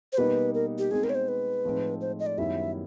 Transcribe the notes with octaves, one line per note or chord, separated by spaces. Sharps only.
C5
B2 G3 A#3 D#4 B4
A#4
G4
B2 G#3 C4 D#4 G#4
A#4
C#5
C5
B4
A2 F3 G#3 C4 D#4
C5
D#5
D5
F#2 D#3 G3 B3 E4 E5